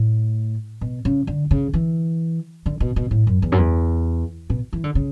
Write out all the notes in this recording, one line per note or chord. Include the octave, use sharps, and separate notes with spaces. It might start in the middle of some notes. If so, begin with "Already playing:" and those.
Already playing: A2
B2
C#3
D3
C#3
E3
D3
B2
B2
A2
F#2
E2
F#2
E2
B2
E3
D3
C#3